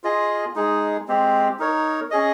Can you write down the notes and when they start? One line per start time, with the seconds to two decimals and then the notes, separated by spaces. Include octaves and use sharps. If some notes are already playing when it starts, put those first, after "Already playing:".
0.04 F4 G#4 D#5
0.55 G#3 D#4 G#4
1.08 G#3 C4 G4
1.59 D#4 A#4 C#5
2.11 C#4 G#4 D#5